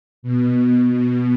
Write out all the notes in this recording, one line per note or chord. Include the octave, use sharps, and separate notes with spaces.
B2
B2